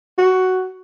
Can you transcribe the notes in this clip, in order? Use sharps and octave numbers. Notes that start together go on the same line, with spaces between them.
F#4